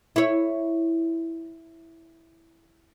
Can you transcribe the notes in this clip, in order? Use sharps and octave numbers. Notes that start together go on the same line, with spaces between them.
E4 C#5